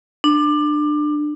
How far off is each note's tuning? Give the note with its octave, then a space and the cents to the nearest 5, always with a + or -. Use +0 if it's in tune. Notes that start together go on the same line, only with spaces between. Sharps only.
D4 +25